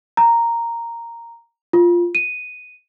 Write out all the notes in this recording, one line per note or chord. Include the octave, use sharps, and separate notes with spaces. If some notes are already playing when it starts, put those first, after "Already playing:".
A#5
F4
D#7